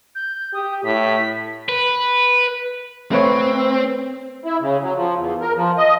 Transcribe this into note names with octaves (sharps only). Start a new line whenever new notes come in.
G6
G4 D#6
A2 B6
B4
A3 C4 B4 C#5
E4
C#3
F#3
F3
E2
A#4
F3
D#5